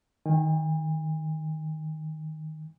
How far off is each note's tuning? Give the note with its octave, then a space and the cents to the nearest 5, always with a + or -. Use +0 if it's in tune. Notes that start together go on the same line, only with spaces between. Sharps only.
D#3 +0 G#5 -45